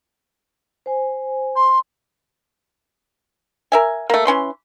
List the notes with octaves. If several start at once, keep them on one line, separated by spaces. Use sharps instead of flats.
C5 G#5
C6
A#4 E5 G#5
A3 A#3
E3 C#4 C6